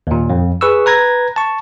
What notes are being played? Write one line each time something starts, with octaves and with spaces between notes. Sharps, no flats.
D#2 A#2
F2
G#4 B4 C#6 E6
B4 A#5 G#6 A#6
A5 C#6